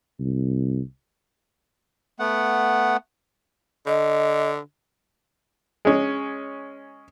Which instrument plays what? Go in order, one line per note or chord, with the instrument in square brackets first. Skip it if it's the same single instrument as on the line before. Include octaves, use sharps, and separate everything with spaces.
[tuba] C2
[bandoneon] A3 B3 F#5
[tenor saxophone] D3 [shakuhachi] D#5
[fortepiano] G#3 C#4